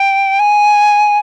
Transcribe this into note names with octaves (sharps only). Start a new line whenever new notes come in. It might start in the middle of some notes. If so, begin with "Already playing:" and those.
Already playing: G5
G#5